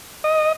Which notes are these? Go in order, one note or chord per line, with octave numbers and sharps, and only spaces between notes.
D#5